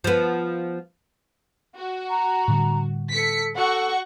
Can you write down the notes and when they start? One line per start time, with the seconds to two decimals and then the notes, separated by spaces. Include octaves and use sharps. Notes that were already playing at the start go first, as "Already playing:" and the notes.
0.04 F3 B3
1.77 F#4
2.09 A#5
2.48 A2 D3 G3
3.13 A4 B6 C#7
3.55 F#4 A4 F#5 C#6